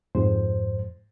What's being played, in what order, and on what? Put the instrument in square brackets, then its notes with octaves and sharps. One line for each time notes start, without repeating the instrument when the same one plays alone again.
[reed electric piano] F2 G#2 C5